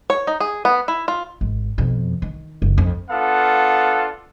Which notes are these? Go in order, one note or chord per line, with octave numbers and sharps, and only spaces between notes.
C#5
D#4
G#4
B3
E4
F4
G#1
F2 B2
D#3
F#1
F2
B3 D4 F4 A4 F5 F#5